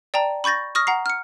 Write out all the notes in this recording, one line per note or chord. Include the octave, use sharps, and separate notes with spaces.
D5 G5 A5 A#5
B5 C#6 G6 A6 A#6
C#6 D#6 F6 A#6
F#5 A#5 C7
F6 C#7